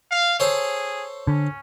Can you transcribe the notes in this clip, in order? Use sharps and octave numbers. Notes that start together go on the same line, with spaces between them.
F5
G#4 A4 C5 C#5
D3 C#4